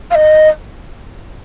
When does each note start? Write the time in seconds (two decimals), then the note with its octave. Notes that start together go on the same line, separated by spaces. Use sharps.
0.11 F5
0.15 D#5